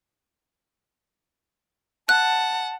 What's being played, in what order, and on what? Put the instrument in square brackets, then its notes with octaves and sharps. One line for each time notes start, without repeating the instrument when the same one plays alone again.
[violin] F#5 [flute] A5 [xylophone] F#6